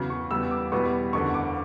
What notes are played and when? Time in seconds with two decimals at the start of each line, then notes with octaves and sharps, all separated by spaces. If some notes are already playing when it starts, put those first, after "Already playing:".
Already playing: E2 C#3 F#3
0.10 C#6
0.30 E2 C#3 G3 B3 E6
0.51 D6
0.72 E2 B2 G3 B3 C#6
1.13 F#1 E2 D3 C#6
1.34 D6